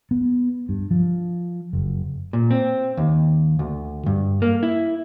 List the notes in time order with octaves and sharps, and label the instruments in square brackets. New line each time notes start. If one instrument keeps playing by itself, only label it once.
[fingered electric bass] B3
G2
F3
F#1
[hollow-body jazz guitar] A#2
C4
D#2
D2
G2
A#3
E4